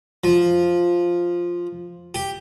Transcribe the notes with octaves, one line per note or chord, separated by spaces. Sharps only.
F3
G4